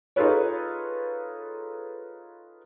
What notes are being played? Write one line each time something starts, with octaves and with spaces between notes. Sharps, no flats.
D#4 F4 G#4 A4 B4 C#5